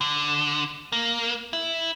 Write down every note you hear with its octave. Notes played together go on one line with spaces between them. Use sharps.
D3
A#3
E4